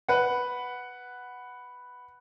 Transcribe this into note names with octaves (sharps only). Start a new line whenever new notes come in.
B4 F#5